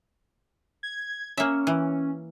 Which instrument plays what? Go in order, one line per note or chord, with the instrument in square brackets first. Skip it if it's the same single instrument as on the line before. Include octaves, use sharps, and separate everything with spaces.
[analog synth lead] G#6
[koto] A#3 E5 [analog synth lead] C#4
[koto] E3